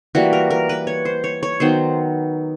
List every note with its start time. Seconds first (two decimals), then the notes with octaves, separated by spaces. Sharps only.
0.15 E3 G3 A#3 F#4
0.33 A#4
0.50 A#4
0.69 B4
0.87 C#5
1.05 C5
1.24 C#5
1.43 C#5
1.60 D#3 F#3 B3 C5